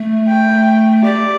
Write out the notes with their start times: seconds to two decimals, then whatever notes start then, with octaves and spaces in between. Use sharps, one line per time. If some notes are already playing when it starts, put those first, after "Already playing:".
Already playing: A3
0.28 G5
1.03 G4 D5